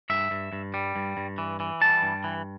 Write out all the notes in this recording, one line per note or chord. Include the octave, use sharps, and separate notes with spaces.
G2 E5
G2
G2
G3
G2
G2
E3
E3
G3 A5
G2
E3